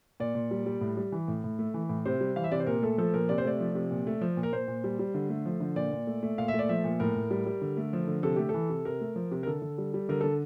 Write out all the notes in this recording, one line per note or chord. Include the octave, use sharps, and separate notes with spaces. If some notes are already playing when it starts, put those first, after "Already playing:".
A#2 D5
A#2
G3
G3
A2
G3
E3
A2
A2
A3
E3
A2
C3 C5
G3
E3 F5
E5
C3 D5
C5
A#2 A#4
A3 A4
F3 A4
A#2 A#4
C3 D5
C5
A3 D5
F3
C3
A#2
A3
F3
A#2
A#4
A#2 C5
A#2
G3
G3
D3
A3
F3
D3
A#2 D5
A#2
A3
A3
A#2 F5
E5
A3 D5
F3 E5
A#2
A2 A#4
A2
G3
G3
D3
A3
F3
D3
C3 A4
A3 G4
A4
E3
C3
C3 A#4
A3
F3
C3
A#4
D3 A4
D3
G3
G3
D3 A#4
D3 A4